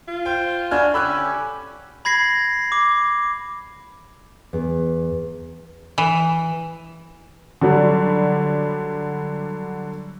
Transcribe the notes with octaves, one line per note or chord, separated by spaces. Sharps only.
F4
C5 G5
D4 E4 F#4 G#5 F6
D3 C#4 G4 B5 E6 F#6
B5 G#6 A#6 C7
D6
E2
E3
D3 F#3 G3